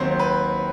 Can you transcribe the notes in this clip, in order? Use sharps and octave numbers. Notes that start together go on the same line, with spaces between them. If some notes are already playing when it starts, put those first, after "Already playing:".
Already playing: D#2 D#3 F#3 C4 C5
B4